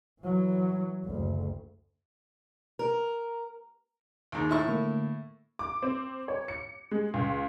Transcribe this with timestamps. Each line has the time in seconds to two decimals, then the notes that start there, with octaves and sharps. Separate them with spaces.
0.21 E3 F#3
1.05 F#1 D2
2.79 A#4
4.32 D#2 G#2
4.49 A2 E4 C#6
4.68 D3 A3 A#3
5.59 D6
5.82 C4
6.28 C#5
6.48 C#7
6.91 G#3
7.14 C#2